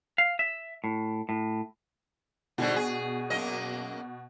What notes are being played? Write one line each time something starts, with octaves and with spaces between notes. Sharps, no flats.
F5
E5
A2
A2
G#2 B2 D3 G3
G#4
F#2 A#3 D#5